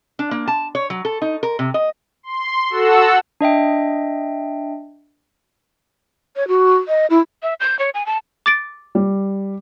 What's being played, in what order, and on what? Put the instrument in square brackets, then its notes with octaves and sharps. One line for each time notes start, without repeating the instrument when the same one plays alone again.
[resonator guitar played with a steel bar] D4
A#3
A5
C#5
F#3
A4
D#4
A#4
C3
D#5
[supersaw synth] C6
F#4 A4 F#5 E6
[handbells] D4 D#5 E5 G5
[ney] C#5
F#4
D#5
E4
[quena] E5
G6
C#5
G#5
A5
[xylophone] D6 A6 D7
[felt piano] G3